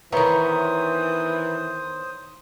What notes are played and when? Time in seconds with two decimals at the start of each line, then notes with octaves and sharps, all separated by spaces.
0.12 D#3 E3 B3 C5 C#5 E5 A#5 D#6